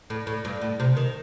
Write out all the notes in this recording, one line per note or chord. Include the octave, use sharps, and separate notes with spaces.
A2
A2
G2
A2
C3
D#3